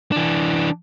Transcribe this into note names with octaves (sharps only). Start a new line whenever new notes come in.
E3 D4